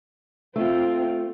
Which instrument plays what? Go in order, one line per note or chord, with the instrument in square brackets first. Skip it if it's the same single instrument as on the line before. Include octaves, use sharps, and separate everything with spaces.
[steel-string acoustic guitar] A3 [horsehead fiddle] C4 F4